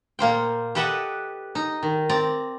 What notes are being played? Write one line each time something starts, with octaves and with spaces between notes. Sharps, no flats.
A#2 A#3 C5 G5
G4 A4 B4 D#5 E5 F#5
D#4
D#3
C4 D5 A#5